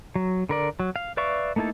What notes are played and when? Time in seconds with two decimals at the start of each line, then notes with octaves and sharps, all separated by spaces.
0.16 F#3
0.49 D3 A#4 D5
0.80 F#3
0.96 F5
1.17 B4 D5 E5 F5 C#6
1.56 A3 A#3 D#4 E4 A4